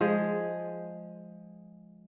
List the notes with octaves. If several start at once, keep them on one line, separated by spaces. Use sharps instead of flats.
F3 G#3 G#4